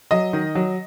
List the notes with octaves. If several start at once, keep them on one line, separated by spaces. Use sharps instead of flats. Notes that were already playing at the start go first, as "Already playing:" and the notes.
F#3 D#5
D#3
F#3